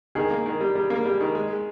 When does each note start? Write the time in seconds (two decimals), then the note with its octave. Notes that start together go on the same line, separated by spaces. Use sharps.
0.15 D#3 G#4
0.30 A#3
0.46 D#3
0.61 G3
0.75 G3
0.90 A#3
1.05 G3
1.20 D#3
1.35 G#3
1.50 G#3